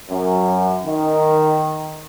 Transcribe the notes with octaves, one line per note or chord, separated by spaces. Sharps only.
F#2
D#3